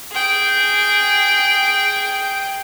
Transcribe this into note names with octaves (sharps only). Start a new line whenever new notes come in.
G#4 G5